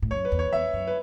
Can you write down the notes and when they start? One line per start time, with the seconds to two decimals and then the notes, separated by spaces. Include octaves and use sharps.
0.02 A2
0.11 F#2 C#5
0.25 B4
0.32 E2
0.39 C#5
0.53 E2 E5
0.73 F#2
0.87 B4